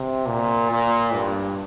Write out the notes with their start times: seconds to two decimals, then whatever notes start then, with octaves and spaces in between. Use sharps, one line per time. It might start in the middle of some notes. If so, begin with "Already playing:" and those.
Already playing: C3
0.26 A#2
0.71 A#2
1.15 G2